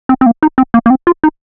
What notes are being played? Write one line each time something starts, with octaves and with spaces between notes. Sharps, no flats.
C4
C4
A#3
D#4
C4
A#3
A#3
C4
F4
D#4